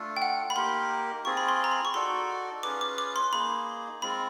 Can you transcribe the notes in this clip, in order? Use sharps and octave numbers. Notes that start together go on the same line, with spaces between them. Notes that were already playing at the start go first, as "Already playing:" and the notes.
Already playing: A3 D4 F4 A4
G5
F#5
B5
A#3 D#4 G4 A#4 C6
C4 F4 G#4 C#6
B5
C6
A#5
B5
C#6
D#4 F#4 A4 D5 C6
C#4 F4 G#4 B4 D6
D6
D6
C6
A#3 D#4 G#4 B5
G#3 C4 F4 B5